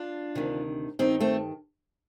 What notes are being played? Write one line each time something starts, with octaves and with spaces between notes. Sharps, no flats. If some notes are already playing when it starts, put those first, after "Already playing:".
Already playing: D4 F4
D2 C3 D#3
G2 D#3 C4 D#4
A3 C4